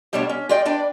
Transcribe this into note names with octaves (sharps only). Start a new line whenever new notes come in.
D2 B2 G3 A3 D4 C#5
C#4
F4 G#4 D5 D#5 G5
D4 B4 D5 G5